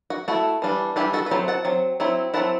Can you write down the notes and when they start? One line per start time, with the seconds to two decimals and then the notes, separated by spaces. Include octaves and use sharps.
0.10 F#4
0.28 A3 E4 F#4 A4
0.62 E3 G3 D4
0.96 E3 G3 D4 E4 G4
1.13 F#4 A4
1.26 B4
1.31 F#3 C4 E4 A4 C5
1.48 F#5 A5
1.65 F#3 C4
2.00 F#3 C4 E4
2.34 F#3 C4 E4 F#5 A5